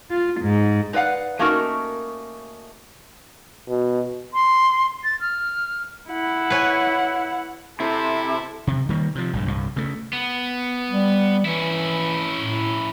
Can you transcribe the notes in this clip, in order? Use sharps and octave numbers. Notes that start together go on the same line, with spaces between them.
F4
G#2
D#4 B4 D5 F5 F#5
A3 A#3 C#4 D#4 F#4 A#4
B2
C6
A6
F6
E4 F#5
B4 C#5 G#5
C3 E4 A4
C3
D#3 G3 A#3
C3 F3
A#1 G2 A#2
C2 G2
C#3 A3
B3
G3
E3 C#4 E4
A2